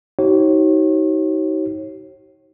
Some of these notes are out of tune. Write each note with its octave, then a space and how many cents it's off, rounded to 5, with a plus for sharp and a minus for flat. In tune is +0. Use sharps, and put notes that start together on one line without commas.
D#4 +30 G4 -45 C#5 -35